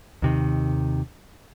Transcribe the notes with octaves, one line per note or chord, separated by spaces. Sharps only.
D#2 C3 D#3